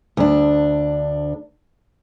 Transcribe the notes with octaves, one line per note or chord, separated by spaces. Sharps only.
D2 D4